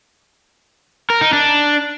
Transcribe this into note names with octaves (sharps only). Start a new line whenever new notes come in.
A#4
D#4
D4